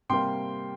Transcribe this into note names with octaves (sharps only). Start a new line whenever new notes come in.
C3 G3 A#3 G5 C6